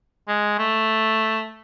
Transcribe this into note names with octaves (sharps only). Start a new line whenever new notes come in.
G#3
A3